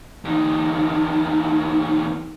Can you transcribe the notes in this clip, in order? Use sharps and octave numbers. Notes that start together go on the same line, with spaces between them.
E2 D#4